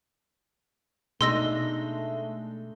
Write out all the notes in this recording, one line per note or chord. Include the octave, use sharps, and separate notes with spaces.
B2 G#3 A3 D4 D#4 C6 E6 A#6